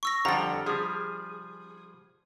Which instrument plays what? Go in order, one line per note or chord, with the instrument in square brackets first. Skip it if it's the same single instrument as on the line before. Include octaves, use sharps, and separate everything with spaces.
[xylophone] C#6 E6 A#6
[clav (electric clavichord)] F2 F3 [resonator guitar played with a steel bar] D3 G3 F#5 [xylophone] A#5 A6
[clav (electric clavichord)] F3 G3 [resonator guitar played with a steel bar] G#4